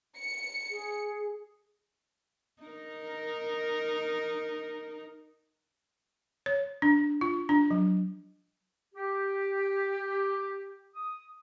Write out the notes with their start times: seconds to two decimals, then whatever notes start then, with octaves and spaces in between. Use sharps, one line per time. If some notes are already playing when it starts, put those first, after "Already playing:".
0.17 C#7
0.70 G#4
2.62 D#4 A#4
6.46 C#5
6.82 D4
7.21 F4
7.49 D4
7.71 F#3
8.95 G4
10.95 D#6